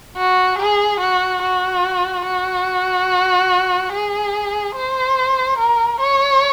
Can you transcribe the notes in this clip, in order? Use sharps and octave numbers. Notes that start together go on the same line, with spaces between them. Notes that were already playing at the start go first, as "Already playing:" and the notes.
F#4
G#4
F#4
F#4
F#4
G#4
C5
A#4
C#5